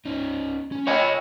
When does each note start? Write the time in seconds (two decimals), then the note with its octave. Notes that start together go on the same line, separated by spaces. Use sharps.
0.05 C#4 D#4
0.72 C#4
0.87 C#5 D#5 G#5 B5